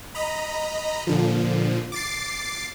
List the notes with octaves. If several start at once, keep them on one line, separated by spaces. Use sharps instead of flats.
D#5 A#5 B5
A#2 D3 F3
D6 A6 C7